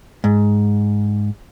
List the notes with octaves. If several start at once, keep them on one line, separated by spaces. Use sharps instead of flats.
G#2